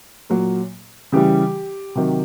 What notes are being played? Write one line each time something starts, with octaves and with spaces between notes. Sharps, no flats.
A#2 F#3
C#3 E3 G3 G4
C3 D#3 F#3